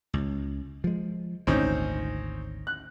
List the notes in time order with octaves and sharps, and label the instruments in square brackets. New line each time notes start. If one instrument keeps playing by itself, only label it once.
[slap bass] C#2
F3 G#3
[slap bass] G#1 D2 A#2 [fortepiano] C4 C#4 D#4
[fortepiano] F#6